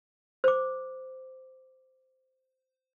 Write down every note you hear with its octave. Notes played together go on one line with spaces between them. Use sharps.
C5 D6